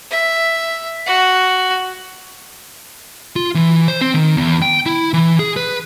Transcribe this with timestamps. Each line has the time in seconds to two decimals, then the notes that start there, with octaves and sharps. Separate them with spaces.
0.11 E5
1.06 F#4
3.36 F4
3.55 E3
3.88 C5
4.01 C4
4.14 D#3
4.37 E2
4.62 G5
4.86 E4
5.14 E3
5.39 G#4
5.56 B4